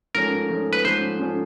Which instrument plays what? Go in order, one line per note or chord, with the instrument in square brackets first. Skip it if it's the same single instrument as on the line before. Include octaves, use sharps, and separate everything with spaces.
[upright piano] G#2 F3 A3 C#4 [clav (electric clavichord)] A#4
[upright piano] G#2 F3 A3 C#4
[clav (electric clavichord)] B4
[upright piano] G#2 F3 A3 C#4 [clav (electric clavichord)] C5
[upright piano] G#2 F3 A3 C#4